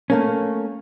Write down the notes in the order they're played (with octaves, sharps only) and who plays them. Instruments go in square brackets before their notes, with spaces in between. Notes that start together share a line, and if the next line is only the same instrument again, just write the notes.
[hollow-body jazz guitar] A3 A#3 C#4